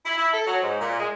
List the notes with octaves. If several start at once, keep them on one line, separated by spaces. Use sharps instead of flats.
E4
E4
A4
F#3
G#2
A#2
G#3